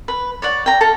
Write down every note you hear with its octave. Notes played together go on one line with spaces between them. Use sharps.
B4
C#5 D5 F#5
G5 A#5
A4 F5